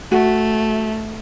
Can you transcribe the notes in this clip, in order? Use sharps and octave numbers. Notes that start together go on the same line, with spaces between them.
A3 F#4